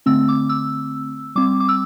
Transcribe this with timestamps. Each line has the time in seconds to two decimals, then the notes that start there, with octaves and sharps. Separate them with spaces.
0.06 D3 A3 C4 E6
0.29 D6
0.49 E6
1.36 G3 C4 D6
1.60 D6
1.69 E6